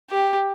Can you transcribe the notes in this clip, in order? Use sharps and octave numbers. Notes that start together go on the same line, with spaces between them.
G4